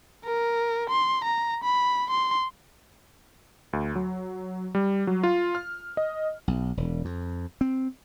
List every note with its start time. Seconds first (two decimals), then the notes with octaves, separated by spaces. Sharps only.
0.25 A#4
0.89 C6
1.24 A#5
1.64 B5
2.10 C6
3.73 D2
3.96 F#3
4.75 G3
5.07 F#3
5.23 F4
5.55 F6
5.97 D#5
6.48 B1
6.77 E1
7.05 F2
7.61 C4